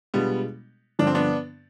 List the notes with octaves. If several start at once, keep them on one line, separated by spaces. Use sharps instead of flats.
B2 G3 G#3 B3 D4 F4
G2 D3 F3 D4
C4
B3 D4